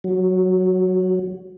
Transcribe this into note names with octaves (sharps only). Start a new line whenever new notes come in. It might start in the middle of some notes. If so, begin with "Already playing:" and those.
F#3